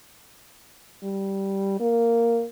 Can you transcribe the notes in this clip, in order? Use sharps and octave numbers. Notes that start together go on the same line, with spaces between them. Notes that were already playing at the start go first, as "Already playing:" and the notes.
G3
A#3